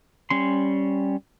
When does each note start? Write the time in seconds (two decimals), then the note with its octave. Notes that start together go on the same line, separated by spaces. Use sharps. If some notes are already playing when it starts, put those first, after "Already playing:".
0.30 G3 C#4 C6